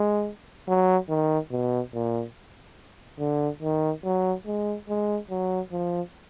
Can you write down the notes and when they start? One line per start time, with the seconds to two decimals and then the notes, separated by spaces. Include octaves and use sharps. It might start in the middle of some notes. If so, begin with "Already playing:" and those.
Already playing: G#3
0.68 F#3
1.09 D#3
1.51 B2
1.94 A#2
3.19 D3
3.62 D#3
4.04 F#3
4.46 G#3
4.89 G#3
5.30 F#3
5.72 F3